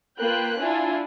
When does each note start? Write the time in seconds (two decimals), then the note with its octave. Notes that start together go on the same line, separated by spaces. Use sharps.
0.19 A#3 F4 B4 G5 F#6
0.59 D4 E4 F4 G#5